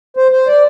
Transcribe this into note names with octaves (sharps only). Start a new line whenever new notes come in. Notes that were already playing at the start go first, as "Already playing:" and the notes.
C5
C5
D5